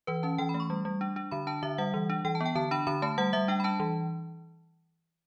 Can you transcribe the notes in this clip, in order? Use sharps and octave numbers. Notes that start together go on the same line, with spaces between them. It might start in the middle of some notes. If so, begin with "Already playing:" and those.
E3 B4
C#4 A5
E3 G5
B5
A3
C#6
G3
G3
D4
D4
D3 B5
D4 A5
D3 E5
G3 F#5
E3
D4
E3 G5
A5
B3
G5
D3 A5
D4 B5
D3 B5
A3 A5
G3 F#5
G3 E5
D4 G5
B5
D4 A5
E3